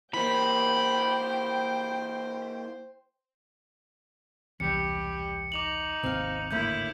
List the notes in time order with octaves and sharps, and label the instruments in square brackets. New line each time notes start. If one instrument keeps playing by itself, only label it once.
[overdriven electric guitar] E3 A#3 [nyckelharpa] C5 [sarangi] G5 [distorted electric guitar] B5
[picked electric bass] E1 C2 E3 [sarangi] G3 [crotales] C#7
[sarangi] D#4 [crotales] D6 F7 F#7
[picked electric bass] G#1 D#2 C3 [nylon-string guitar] C4 F5
[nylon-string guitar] A2 D3 A#3 [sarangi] E4 [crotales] G6